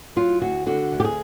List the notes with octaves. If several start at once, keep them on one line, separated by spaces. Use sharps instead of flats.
F#3 F4
D2 F#4
D3 F#4
D2
G4
G#4